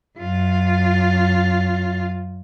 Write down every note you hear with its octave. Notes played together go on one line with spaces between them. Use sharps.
F#2 F4